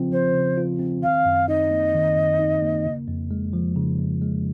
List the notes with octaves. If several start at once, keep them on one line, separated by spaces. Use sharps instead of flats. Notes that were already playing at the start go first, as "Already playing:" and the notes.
Already playing: C#3 F3 C4 F4
F3 C5
C#3
F4
C4
D#3 F5
F#2
D#4 D#5
A#3
D#3
F#2
D#4
A#3
C#3
F2
G#3
F3
C#3
F2
G#3